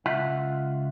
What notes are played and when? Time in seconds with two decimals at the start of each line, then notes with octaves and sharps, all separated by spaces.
0.06 C#2 F4 E5 F#5